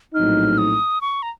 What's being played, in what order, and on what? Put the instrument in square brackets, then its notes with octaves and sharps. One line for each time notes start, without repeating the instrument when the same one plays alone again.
[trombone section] A#1 A2 F#3 C4 D#4 [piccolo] F6
[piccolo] D#6
C#6
A#5